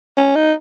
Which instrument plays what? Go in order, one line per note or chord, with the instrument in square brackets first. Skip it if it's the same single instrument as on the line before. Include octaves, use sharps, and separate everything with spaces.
[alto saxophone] C#4
D#4